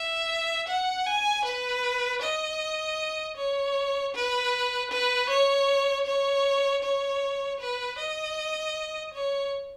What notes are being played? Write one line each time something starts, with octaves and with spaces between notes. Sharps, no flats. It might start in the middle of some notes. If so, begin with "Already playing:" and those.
Already playing: E5
F#5
G#5
B4
D#5
C#5
B4
B4
C#5
C#5
C#5
B4
D#5
C#5